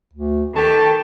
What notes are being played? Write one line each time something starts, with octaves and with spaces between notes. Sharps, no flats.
D2
D#3 G4 A4 B4 C#5 A5